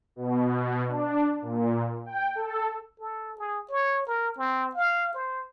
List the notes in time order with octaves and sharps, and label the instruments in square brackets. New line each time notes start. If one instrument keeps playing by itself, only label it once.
[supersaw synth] B2
D4
A#2
G5
A4
[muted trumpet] A4
G#4
C#5
A#4
C4
F5
C5